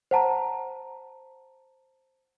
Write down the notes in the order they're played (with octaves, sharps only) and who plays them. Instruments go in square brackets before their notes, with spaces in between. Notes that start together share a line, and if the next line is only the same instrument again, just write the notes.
[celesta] C5 F#5 A5 A#5